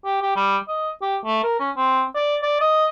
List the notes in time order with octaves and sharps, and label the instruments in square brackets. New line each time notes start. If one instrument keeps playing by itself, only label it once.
[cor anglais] G4
G4
G3
D#5
G4
A3
A#4
C#4
C4
D5
D5
D#5